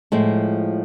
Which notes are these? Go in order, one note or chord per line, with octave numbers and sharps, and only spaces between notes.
A2 F3 G#3